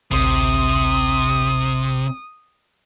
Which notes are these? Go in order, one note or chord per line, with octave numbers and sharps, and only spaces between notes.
A1 D2 C3 C6 D#6